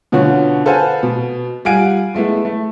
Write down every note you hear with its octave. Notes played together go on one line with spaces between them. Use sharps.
B2 D3 C#4 F4 F#4
A4 B4 C5 F5 F#5 G#5
B2
G3 F4 F5 F#5 G#5 D7
G#3 A3 B3 E4
A3